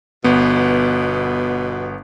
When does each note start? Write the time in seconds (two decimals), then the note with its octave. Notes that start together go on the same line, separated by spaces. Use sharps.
0.24 G1 B2 B3